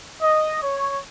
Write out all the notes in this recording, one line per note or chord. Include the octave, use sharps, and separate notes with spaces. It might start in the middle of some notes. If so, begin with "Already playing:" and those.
D#5
C#5